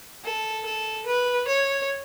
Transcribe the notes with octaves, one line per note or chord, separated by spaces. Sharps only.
A4
A4
B4
C#5